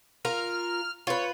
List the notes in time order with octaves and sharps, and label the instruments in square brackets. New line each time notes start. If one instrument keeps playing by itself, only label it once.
[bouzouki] F4 A#4 A#5 [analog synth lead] F6
[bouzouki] F4 B4 [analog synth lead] C#5